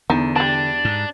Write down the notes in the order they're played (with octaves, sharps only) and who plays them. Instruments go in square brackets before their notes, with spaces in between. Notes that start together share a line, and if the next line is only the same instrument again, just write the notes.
[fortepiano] E2 [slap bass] D3 [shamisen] D#4
[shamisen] G3 A5 [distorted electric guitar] D4
[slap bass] G#2